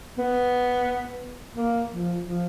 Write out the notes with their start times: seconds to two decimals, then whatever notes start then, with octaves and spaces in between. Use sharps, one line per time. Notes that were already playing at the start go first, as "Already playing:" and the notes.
0.18 B3
1.55 A#3
1.90 F3
2.23 F3